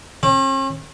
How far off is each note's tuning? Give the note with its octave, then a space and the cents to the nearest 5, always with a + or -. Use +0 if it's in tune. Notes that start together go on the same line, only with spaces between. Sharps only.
C#4 -45